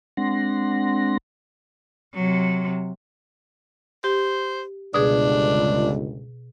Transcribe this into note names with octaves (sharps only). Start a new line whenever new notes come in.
G#3 C4 D4 F#5 C6 A#6
C3 F#3
G4 C5
G1 C#2 B2 D4 G#4